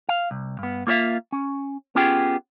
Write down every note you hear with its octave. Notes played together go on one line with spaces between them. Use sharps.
F5
C2
G2 B3
A#3 F4 C#5 E5 F5
C#4
B3 C#4 F4 G4 G#4 G5